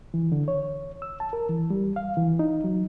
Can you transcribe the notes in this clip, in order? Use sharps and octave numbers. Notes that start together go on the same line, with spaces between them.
E3
D3
C#5
E6
A5
A#4
E3
G3
F5
E3
D#4
F#3